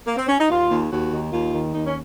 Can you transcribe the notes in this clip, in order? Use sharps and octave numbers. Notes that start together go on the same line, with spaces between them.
A#3
C4
C#4
D#4
D#2 F4
D#2
D#2 F#4
D#3
D#2 F4
D#3
D#2 D#4
C#4